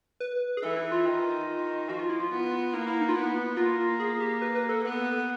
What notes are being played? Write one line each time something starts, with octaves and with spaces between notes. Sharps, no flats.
B4
G#4
E3 A4
E4
F4
D#3
F3 F#4
F4
E4
F4
B3
A#3 E4
E4
D#4
F4
B3 E4
A#3 F4
G#4
G4
B4
B4
A4
B3